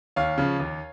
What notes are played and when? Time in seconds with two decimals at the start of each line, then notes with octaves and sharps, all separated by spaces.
0.16 D#2 C#5 F5
0.38 C#3 F3
0.60 D#2